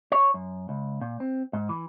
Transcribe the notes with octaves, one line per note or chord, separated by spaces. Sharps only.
C#5
F#2
C#2
A#2
C4
G#2
E3